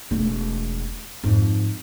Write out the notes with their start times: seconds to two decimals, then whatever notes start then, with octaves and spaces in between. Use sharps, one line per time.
0.11 E1 A3
1.24 F2 G#2